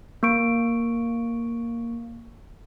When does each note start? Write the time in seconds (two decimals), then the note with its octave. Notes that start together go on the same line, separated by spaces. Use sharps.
0.23 A#3 C#6 D7